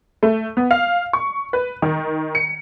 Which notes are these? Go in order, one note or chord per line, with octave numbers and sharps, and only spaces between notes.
A3
B3
F5
C#6
B4
D#3
C#7